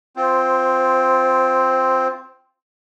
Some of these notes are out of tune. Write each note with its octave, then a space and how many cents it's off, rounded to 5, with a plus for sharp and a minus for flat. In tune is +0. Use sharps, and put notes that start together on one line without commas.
C4 -5 F4 +0 C5 +15